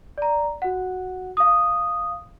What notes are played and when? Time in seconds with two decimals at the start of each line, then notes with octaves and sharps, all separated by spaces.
0.18 D5 A#5
0.62 F#4 F#5
1.37 F5 D#6